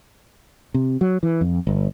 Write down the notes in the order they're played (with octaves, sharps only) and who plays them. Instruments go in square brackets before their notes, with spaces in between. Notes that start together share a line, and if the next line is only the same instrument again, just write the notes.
[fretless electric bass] C3
F#3
E3
F2
G1